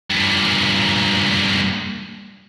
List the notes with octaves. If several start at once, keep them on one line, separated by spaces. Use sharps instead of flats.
G2 A#2